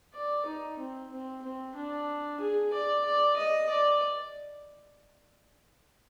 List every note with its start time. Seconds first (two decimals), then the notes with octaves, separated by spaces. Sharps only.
0.14 D5
0.46 D#4
0.79 C4
1.11 C4
1.43 C4
1.75 D4
2.40 G#4
2.73 D5
3.05 D5
3.37 D#5
3.69 D5